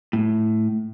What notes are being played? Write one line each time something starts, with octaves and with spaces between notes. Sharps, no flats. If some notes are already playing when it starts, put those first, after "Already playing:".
A2